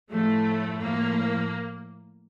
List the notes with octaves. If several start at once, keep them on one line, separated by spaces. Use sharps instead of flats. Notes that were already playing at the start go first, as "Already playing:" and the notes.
A2 F3 A3
A2 F3 A#3